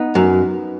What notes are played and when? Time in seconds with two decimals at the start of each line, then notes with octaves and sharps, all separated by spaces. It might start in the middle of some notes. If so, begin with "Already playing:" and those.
Already playing: B3 D#4
0.15 F#2